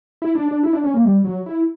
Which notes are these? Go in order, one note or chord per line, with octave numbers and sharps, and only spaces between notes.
E4
D4
D4
E4
D4
C#4
A#3
G3
F#3
E4